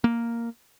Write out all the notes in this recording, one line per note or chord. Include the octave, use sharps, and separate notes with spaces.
A#3